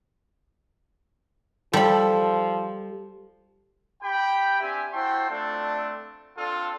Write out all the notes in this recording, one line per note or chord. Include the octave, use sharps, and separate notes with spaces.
F3 G3 A4 B5
G4 G5 B5
C4 D4 G4 E5 G#5
E4 F#4 C5 G5 A5 C6
A3 C4 D4 F4 A4
C4 D4 F4 A4